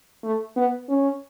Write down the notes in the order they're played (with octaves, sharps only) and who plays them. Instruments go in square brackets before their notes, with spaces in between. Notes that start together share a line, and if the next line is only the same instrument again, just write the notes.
[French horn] A3
B3
C#4